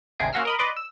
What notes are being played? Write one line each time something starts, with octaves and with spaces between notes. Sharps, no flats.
G#1 D2 C3 G#4 D7
A#3 C#4 F#4 C6 E6 F6
A#4 D#5 B5
B4 D5 D#5 C6 D6
E6